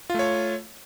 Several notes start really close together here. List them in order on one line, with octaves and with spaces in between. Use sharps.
F4 A3 C#5